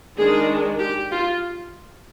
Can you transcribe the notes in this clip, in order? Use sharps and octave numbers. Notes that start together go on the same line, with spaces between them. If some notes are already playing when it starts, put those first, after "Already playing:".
D#3 G#3 D4 G#4
G4
F4